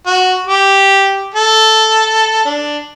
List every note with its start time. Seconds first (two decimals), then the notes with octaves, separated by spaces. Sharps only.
0.06 F#4
0.47 G4
1.34 A4
2.45 D4